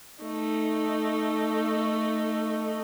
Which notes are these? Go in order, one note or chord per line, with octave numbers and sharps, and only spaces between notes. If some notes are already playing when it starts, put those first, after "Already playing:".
A3 D#4